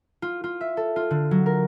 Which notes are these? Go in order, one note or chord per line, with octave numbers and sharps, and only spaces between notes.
F4
F4
E5
A4
F4
D3
F#3
A#4